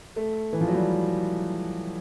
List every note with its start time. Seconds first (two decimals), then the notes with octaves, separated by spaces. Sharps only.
0.16 A3
0.53 E3
0.61 F3
0.67 F#3
0.74 G3